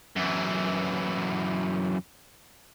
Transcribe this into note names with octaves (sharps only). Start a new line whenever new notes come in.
F#2 E3